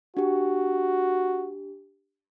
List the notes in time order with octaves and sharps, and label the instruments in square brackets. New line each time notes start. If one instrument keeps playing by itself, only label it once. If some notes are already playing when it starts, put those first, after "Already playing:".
[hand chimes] D4 G4 [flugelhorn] F#4